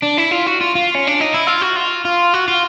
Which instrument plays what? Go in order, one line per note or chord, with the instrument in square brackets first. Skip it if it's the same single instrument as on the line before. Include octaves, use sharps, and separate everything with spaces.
[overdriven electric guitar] D4
E4
F4
F#4
F4
F4
C#4
D4
D#4
E4
F4
F#4
F4
F4
F#4
F4